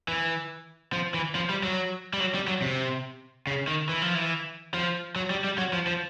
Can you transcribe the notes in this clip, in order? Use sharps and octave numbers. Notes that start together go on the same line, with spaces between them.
E3
F3
E3
F3
G3
F#3
G3
F#3
G3
F#3
C3
C#3
D#3
E3
F3
E3
F3
F#3
G3
G3
F#3
F3
F3